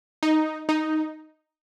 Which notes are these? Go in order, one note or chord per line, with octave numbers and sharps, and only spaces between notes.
D#4
D#4